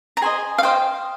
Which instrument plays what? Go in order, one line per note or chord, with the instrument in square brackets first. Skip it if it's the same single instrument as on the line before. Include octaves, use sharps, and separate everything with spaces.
[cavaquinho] A#5
G#4 C5 D#5 G#5
F5
C5 D#5 G5